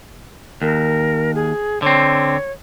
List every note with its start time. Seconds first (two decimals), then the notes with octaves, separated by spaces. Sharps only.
0.62 D#2 A#4
1.35 G#4
1.82 D3 C4 C#5